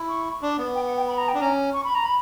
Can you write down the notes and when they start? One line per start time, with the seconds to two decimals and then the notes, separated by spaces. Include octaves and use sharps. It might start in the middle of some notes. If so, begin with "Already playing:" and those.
Already playing: E4
0.09 C#6
0.42 D4
0.58 B3
0.75 G5
0.86 F#5
0.97 G5
1.08 B5
1.18 A#5
1.29 G5
1.34 D4
1.40 C#4 A#5
1.73 C#6
1.84 B5
1.95 A#5
2.05 B5